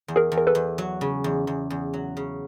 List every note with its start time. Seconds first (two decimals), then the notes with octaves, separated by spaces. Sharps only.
0.08 E2
0.16 G#4 A#4
0.32 E2
0.38 A#4
0.47 A4 B4
0.55 E2
0.78 F#3
1.01 C#3
1.24 E2
1.47 E2
1.70 E2
1.94 F#3
2.17 C#3